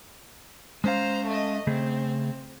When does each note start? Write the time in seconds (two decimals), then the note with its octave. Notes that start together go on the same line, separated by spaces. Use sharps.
0.84 G#3 C#4 C5 F5 A#5
1.26 A3 D#5
1.67 C#3 A3 C4 G#4